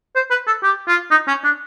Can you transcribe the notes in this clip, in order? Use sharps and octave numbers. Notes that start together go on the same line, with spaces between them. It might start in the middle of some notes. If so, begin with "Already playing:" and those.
C5
B4
A4
G4
F4
D#4
C#4
D4